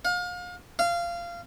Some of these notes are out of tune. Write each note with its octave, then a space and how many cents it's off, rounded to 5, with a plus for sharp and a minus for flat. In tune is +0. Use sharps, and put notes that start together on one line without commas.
F5 +35
F5 -20